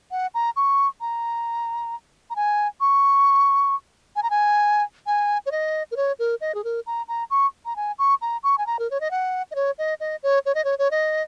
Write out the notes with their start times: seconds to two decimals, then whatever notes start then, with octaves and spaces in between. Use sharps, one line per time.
0.11 F#5
0.34 A#5
0.56 C#6
1.01 A#5
2.30 A#5
2.36 G#5
2.81 C#6
4.16 G#5
4.23 A#5
4.30 G#5
5.06 G#5
5.46 C#5
5.51 D#5
5.91 A#4
5.96 C#5
6.19 A#4
6.41 D#5
6.55 G#4
6.64 A#4
6.86 A#5
7.08 A#5
7.30 C#6
7.65 A#5
7.76 G#5
7.99 C#6
8.21 A#5
8.43 C#6
8.58 G#5
8.66 A#5
8.79 A#4
8.91 C#5
9.00 D#5
9.11 F#5
9.51 D#5
9.55 C#5
9.78 D#5
10.00 D#5
10.23 C#5
10.46 C#5
10.55 D#5
10.64 C#5
10.79 C#5
10.91 D#5